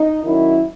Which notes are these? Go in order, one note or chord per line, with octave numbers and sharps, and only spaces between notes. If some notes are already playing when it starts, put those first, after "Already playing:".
Already playing: D#4
F#2 D#3 E4